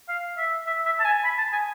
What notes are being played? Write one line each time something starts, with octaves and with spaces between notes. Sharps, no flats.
F5
E5
E5
E5
A5
G#5
B5
A5
G#5